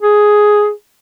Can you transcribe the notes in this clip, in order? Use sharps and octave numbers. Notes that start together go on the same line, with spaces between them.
G#4